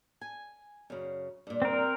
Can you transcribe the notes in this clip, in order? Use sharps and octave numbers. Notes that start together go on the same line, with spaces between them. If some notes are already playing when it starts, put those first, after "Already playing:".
G#5
F#2 C#3
G2 A#2
C4 A#4